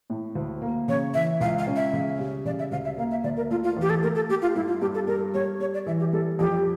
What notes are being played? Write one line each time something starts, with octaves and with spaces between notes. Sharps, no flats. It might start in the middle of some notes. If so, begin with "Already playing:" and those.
A2
D2
A#3
C#3 C#5
E3 E5
C#2 F5
F5
C#4
E5
C#3
G3
C#3 D5
E5
D2 F5
E5
A#3 F5
E5
D2 D5
A#4
A3 F4
F4
E2 G4
A4
A3 A#4
A4
A3 G4
F4
G2 E4
F4
G2 G4
A4
G3 A#4
G3 C#5
G3 C#5
D5
E3 E5
G4
G3 A4
F2 G4